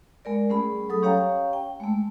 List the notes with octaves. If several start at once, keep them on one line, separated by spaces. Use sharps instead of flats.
G#3 A#4 D5
G3 A3 C#4 G#4 B5
F#3 A4 D#6
C#4 G4 C#5 F5 G5 A#5
G5
G#3 A3